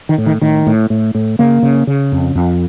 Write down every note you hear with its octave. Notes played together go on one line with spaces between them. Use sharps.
D#3
A2
D#3
A2 D#3
A2
A2
A2
C#3 A#3
C#3
C#3
F2
F2